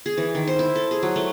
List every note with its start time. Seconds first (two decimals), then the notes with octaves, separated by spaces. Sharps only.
0.06 G#4
0.17 E3
0.35 D#3
0.47 C5
0.59 E4
0.75 A4
0.91 G#4
1.03 F#3
1.16 A3